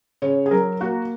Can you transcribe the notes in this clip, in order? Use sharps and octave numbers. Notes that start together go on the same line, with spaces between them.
C#3 C#5
G#4
F#3 A#4
A#3 F#4